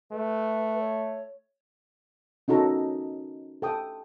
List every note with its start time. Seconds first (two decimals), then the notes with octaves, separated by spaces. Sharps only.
0.12 A3 B4
0.80 C#5
2.48 C#4 D#4 F#4 A4 A#5
3.62 A4 G5 D#6